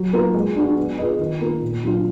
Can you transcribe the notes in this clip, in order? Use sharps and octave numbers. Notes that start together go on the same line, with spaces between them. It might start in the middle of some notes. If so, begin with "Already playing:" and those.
Already playing: F#3
A#3 F4 B4
G#3
D4 F#4
B3
F4 G#4 B4 D#5
D#3
A#3 F4
A#2
F#3 D4 F4